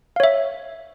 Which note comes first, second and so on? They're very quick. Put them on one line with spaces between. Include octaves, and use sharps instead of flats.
F5 C#5 E5